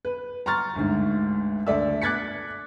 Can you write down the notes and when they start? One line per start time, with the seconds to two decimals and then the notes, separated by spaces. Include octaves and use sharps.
0.05 B4
0.46 A#5 C6 C#6 F6 A6
0.75 G1 D2 G#2
1.67 D2 A4 D5 E5 E6
2.01 D6 F#6 G#6 A6 B6 C#7